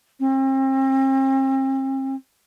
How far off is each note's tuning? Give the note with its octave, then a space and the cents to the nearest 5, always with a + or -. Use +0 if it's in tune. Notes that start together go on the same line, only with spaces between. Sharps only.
C4 +40